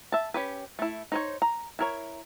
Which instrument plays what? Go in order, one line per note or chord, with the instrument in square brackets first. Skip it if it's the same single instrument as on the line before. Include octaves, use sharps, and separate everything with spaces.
[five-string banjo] E5 A5
C#4 G4 B4
A3 E4
D#4 C5 C#5
A#5
E4 A#4 C#5